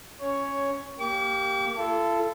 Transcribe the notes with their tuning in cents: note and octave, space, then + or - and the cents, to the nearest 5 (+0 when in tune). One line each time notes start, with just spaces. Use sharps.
C#4 +0 C#5 +5
A#3 +0 G4 +0 D6 -45
F4 -45 A4 +0